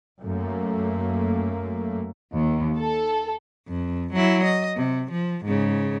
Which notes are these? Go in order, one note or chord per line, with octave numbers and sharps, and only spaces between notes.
F#2 A3 A#3
D#2
A4
F2
F#3 E4
D#5
C3
F3
G#2 C#3